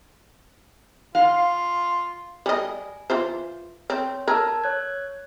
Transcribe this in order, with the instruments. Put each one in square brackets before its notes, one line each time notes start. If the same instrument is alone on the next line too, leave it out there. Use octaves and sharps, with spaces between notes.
[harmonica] F4 [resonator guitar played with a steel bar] F5
[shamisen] G3 D#5 [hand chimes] G#5
[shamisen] E3 F4 C5
[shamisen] C4 [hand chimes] C#5
[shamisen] A#4 [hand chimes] A5 E6 G#6
[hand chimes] C#5 F#6 G#6